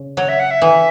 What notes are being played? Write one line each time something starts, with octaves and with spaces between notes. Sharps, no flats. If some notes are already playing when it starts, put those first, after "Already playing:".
Already playing: C#3
F#3 C#5
E5
F#5
E5
E3